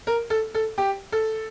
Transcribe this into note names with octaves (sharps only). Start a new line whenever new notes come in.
A#4
A4
A4
G4
A4